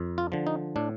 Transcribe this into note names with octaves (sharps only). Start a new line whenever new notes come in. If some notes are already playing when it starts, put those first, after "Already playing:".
Already playing: F2
F4
D3 F3
D#4
A2 D4